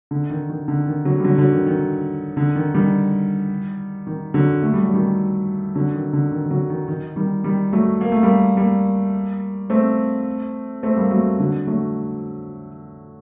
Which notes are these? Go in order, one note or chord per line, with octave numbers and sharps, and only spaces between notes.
D3
D#3
D#3
D3
D#3
D3 F#3
G3
D3 F#3
D3 F#3
D#3
D#3
D3
D#3
D#3 G3
D#3
D3 F#3
A3
G3
F#3
D#3 G3
D3 F#3
D#3
D3
D#3
D#3
D3 F#3
D#3
D#3
D#3 G3
D#3 G3
F#3 A3
A#3
A3
G3 A#3
G3 A#3
A3 C4
A3 C4
G3 A#3
F#3 A3
D3 F#3
F#3 A3